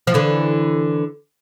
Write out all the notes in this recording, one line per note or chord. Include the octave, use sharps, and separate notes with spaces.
F3
D3 E3